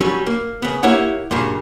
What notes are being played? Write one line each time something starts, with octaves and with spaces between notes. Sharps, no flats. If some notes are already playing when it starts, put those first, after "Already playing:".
F#3 G3 C#4
A#3
C#3 B3
A#3 E4 G4 C#5 F#5
G2 A#2 C#3 F#3